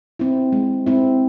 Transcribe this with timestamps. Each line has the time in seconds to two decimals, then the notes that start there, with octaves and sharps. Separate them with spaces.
0.19 C4 E4
0.53 G#3
0.86 C4 E4